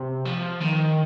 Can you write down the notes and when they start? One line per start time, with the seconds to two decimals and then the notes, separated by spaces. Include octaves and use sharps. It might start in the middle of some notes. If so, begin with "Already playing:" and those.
Already playing: C3
0.25 F3
0.61 D#3